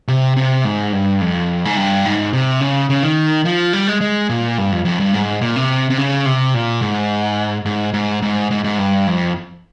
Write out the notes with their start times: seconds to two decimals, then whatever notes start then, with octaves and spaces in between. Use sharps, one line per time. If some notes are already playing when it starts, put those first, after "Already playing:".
0.08 C3
0.37 C3
0.65 G#2
0.93 G2
1.21 F2
1.65 G#2
1.77 G2
2.05 G#2
2.33 C3
2.61 C#3
2.90 C#3
3.03 D#3
3.45 F3
3.73 G3
3.88 G#3
4.01 G#3
4.30 A#2
4.58 G2
4.72 F2
4.85 F2
5.00 G2
5.13 G#2
5.41 A#2
5.56 C3
5.90 C3
5.98 C#3
6.26 C3
6.54 A#2
6.82 G#2
7.66 G#2
7.94 G#2
8.22 G#2
8.51 G#2
8.64 G#2
8.78 G2
9.07 F2